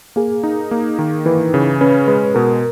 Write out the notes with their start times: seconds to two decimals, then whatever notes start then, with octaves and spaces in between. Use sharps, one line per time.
0.16 A#3 G#4
0.43 D#4
0.71 A#3
0.99 D#3
1.26 E3 B4
1.54 C#3
1.81 C#4 B4
2.07 G#3 B4
2.35 B2 A#4